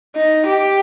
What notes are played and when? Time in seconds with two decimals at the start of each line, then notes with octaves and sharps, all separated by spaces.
0.15 D#4
0.46 G4